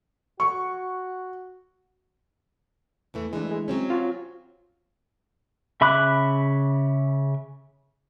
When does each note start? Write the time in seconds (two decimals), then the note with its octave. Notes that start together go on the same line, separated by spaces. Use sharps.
0.40 F#4 C#6
3.14 E2 E3 A3
3.33 E3 G#3 A3 D4
3.51 G#3
3.68 F#3 C4 C#4
3.90 F4 F#4 C#5
5.81 C#3 E5 B5 D6 F#6